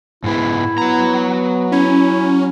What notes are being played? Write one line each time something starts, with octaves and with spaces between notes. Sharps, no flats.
G#2 G#3 B3 E4
F#3 B3 A#5
C#4 E4